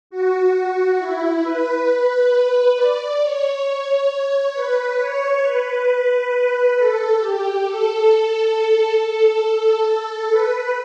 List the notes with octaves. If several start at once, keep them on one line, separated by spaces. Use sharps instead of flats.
F#4
E4
B4
D5
C#5
B4
C#5
B4
A4
G4
A4
A4
B4